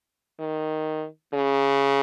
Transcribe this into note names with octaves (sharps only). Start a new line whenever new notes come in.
D#3
C#3